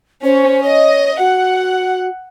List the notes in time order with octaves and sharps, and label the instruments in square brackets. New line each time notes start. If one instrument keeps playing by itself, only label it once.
[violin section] C#4 [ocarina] C5
[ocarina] C#5 [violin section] D#5
[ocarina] F#4 [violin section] F#5